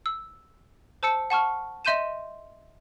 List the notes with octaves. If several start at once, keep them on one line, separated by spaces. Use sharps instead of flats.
E6
C5 A5 E6 C#7
F#5 A5 C#6 F6
D#5 E5 C6 G6 D#7 E7